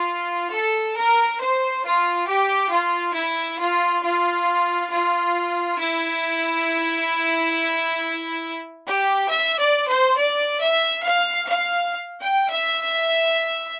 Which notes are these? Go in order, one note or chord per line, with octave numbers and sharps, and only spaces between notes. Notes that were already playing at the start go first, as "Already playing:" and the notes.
Already playing: F4
A4
A#4
C5
F4
G4
F4
E4
F4
F4
F4
E4
G4
E5
D5
C5
D5
E5
F5
F5
G5
E5